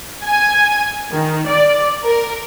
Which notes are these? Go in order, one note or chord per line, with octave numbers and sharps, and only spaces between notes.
G#5
D#3
D5
A#4